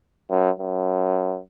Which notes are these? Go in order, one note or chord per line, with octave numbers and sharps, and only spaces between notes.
F#2
F#2